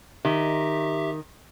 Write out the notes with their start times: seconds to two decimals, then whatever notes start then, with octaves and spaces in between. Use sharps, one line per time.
0.25 D#3 G4 E5